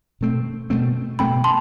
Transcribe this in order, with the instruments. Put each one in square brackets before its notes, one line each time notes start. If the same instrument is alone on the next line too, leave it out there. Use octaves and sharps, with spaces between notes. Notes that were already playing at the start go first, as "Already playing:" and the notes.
[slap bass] B2 A3 C4
B2 A3 C4
[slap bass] B2 A3 C4 [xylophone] G5 B5
[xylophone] A5 C6